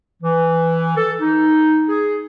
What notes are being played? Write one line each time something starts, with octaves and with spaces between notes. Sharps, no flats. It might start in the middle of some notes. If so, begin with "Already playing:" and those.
E3
A4
D#4
G#4